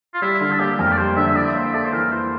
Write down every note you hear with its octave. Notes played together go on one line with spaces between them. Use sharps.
F4
G3 E4
D3 F4
A4
A#3 G4
F2 A#4
D5
G3 C5
D3 E5
E5
E4 D5
A#3 C5
E5
A4 D5
C5
E3 A#4
E4 C5